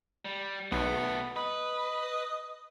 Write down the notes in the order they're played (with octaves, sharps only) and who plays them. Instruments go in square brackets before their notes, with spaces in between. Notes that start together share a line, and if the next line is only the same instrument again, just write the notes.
[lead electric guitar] G3
[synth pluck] B1 [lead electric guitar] B2 A3 [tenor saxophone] B3
[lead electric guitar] B4 [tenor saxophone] D#5